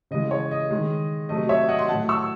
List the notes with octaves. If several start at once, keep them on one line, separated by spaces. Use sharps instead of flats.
C#3 E3 G#3 D#5
C#5
D#5
D#3 G#3
C3 F#3 A3 D#5
C#5 E5
D#5 F#5
C6
A2 F#3 A3 F#5 A5
C#6 E6